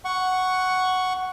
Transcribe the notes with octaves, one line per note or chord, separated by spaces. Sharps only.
F#5 C#6